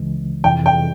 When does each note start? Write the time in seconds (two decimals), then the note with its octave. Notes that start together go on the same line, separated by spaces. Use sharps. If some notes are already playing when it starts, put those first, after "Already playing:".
Already playing: C#2 C#3 E3 G#3
0.44 F2 C3 E3 G5
0.66 G5